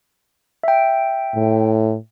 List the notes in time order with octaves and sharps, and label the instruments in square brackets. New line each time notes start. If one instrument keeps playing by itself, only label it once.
[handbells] E5 G5
[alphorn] A2